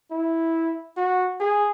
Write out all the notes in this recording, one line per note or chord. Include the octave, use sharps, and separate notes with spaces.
E4
F#4
G#4